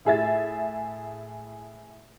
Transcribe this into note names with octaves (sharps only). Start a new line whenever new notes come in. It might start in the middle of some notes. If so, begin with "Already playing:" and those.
A2 G#4 E5 A6